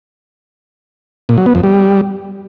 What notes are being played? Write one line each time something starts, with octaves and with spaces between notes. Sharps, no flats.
A#2
F#3
B3
F2
G3